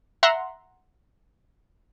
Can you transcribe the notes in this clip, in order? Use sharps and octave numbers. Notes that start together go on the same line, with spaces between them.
E5 F#5 A#5 C6